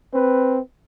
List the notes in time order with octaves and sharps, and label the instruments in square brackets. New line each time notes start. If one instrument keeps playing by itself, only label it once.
[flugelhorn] C4 [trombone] B4